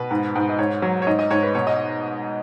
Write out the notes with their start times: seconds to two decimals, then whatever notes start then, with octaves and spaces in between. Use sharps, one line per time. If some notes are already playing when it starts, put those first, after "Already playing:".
Already playing: B2 B4
0.11 G#2
0.35 G#2
0.49 D#5
0.59 G#2 C#5
0.82 F#3
1.02 C#5
1.07 G#2 D#5
1.19 D#5
1.30 G#2 C#5
1.43 B4
1.55 B2 C#5
1.67 D#5